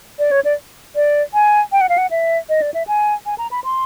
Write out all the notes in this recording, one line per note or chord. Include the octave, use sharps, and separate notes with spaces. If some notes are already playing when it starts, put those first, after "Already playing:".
D5
C#5
D5
D5
G#5
G5
F#5
F5
F#5
E5
D#5
D5
E5
G#5
G#5
A#5
B5
C6